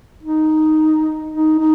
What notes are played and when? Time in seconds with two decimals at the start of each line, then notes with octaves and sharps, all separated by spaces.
0.23 D#4
1.32 D#4
1.59 D#4